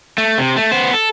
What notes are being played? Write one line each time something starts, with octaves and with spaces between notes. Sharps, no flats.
A3
C3
A3
B3 C5
A4